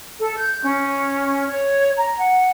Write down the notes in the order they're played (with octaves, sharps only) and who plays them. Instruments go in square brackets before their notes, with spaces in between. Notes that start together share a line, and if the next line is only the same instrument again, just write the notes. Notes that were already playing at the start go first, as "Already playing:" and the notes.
[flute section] A4
G6
C#4
C#5
A#5
F#5